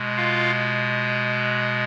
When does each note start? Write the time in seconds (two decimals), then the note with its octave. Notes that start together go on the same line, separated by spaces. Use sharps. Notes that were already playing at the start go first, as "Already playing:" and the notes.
Already playing: B2 G#3
0.17 F4 F5